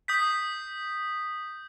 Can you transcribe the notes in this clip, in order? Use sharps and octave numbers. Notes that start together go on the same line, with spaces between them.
D#6 G6 B6